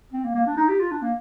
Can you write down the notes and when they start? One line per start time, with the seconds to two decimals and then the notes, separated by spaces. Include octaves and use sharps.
0.13 C4
0.25 A#3
0.35 A#3
0.47 D4
0.57 D#4
0.69 G4
0.80 F4
0.91 D4
1.02 A#3